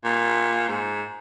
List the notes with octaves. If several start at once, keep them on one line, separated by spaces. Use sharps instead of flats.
A#2
G#2